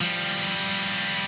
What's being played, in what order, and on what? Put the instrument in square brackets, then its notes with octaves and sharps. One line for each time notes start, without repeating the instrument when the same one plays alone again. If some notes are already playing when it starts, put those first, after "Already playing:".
[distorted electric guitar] F3 G3